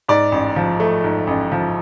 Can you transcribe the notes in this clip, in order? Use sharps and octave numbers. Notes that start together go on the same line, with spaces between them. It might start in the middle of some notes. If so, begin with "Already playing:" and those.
G#2 D5
A1
F3
A3
G#2
A1
F3